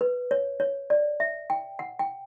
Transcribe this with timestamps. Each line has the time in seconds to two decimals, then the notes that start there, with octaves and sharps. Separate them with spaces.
0.01 B4
0.31 C#5
0.60 C#5
0.90 D5
1.20 E5
1.50 G5
1.79 F#5
1.99 G5